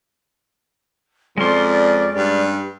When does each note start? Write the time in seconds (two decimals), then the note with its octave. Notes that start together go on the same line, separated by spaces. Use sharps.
1.38 F2 G#3 C#4 D5 C6
2.15 G2